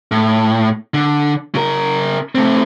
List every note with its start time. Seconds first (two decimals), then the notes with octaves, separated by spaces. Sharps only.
0.11 A2
0.94 D3
1.55 C#3 A#4
2.35 A3 C4